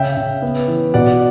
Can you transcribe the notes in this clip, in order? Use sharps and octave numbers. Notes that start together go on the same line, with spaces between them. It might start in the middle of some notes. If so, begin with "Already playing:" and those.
Already playing: C#3 E5 G5
C#3
B3
E3
B2 D5 F#5